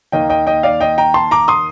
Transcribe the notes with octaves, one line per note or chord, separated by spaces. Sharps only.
D#2 D#3 A#3 D#5 G5
D#5 G5
D#5 G5
D5 F5
D#5 G5
G5 A#5
A5 C6
A#5 D6
C6 D#6